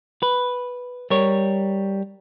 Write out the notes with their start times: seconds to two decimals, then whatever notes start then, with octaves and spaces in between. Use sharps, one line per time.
0.23 B4
1.10 G3 A#4 C#5